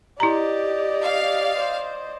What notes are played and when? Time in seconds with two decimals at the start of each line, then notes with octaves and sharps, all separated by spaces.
0.20 E4 G4 D5 D#5 A#5
1.03 F5
1.56 C5